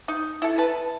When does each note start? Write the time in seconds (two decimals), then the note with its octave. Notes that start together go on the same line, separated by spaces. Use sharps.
0.08 D#4
0.42 E4 A4
0.58 B4 A5